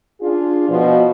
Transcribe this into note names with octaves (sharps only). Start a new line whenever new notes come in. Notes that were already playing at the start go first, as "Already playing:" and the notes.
D4 F4 G#4
B2 F3